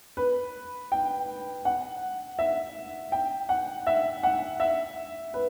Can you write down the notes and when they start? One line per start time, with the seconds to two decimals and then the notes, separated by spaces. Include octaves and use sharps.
0.17 B4
0.92 G5
1.65 F#5
2.39 E5
3.12 G5
3.49 F#5
3.87 E5
4.23 F#5
4.60 E5
5.34 B4